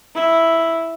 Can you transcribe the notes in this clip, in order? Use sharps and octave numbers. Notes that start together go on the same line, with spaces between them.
E4